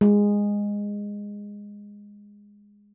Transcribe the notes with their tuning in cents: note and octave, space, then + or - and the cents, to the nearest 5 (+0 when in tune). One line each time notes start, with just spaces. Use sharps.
G#3 -15